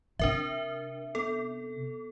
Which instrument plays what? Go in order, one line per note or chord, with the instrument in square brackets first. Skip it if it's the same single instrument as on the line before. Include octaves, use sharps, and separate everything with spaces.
[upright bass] C3 [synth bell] D4 A#4 E5
[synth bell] B3 A4